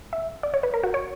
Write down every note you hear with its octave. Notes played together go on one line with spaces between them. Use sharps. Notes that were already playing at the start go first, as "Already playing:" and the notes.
E5
D5
C#5
B4
A#4
F#4
C#5